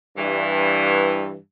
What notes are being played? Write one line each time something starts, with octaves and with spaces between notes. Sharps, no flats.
G2 E3